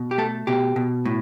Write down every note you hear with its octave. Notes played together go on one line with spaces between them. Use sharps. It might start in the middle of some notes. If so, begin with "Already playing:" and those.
Already playing: B2
G4
A3 A4
B2 G4
B2
A2